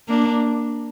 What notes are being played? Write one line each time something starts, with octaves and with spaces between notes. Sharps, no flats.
A#3 D4